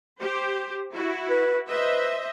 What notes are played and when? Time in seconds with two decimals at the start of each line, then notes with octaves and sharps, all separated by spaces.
0.20 G4 C5
0.94 E4 F#4
1.30 B4
1.69 B4 C5 D#5 E5